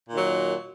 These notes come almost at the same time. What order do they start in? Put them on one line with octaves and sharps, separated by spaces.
A#2 D#3 F#3